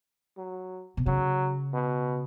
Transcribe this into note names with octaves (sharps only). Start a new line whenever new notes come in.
F#3
B2
C#3 F#3
B2